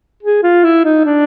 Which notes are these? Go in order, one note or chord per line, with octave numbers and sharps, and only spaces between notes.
G#4
F4
E4
D#4
D4